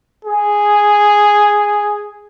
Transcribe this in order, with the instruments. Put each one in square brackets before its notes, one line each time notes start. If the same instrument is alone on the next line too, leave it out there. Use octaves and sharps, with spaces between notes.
[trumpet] G#4